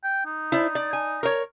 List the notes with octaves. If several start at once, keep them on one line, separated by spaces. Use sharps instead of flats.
G5
D#4
E4 C5 D5
D5
G#5
A#4 C#5